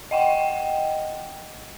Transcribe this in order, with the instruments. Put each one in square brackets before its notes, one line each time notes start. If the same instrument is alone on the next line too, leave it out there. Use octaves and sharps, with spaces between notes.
[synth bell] D#5 F#5 G5